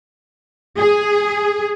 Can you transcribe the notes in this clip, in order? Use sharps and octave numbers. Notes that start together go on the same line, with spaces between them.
G#4